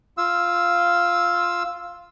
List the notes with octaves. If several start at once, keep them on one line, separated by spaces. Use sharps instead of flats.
F4 F5 E6